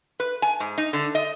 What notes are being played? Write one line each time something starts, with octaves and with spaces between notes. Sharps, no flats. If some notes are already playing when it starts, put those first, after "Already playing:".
B4
G#5
G#2
D#4
D3
D#5